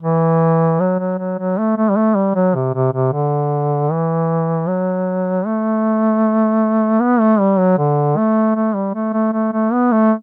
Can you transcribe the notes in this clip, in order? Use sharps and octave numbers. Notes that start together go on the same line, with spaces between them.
E3
F#3
F#3
F#3
F#3
A3
A3
G3
A3
G3
F#3
C3
C3
C3
D3
E3
F#3
A3
B3
A3
G3
F#3
D3
A3
A3
G3
A3
A3
A3
A3
B3
A3